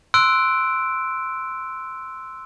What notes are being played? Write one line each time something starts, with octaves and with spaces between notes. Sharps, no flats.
C6 E6 F#6 D7